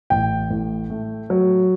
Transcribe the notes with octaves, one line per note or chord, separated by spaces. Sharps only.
A1 G5
A2
A3
F#3